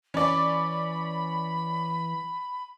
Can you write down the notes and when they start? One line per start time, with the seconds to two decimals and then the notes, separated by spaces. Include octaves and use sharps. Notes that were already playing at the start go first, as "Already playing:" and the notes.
0.14 E3 C#4 D5 B5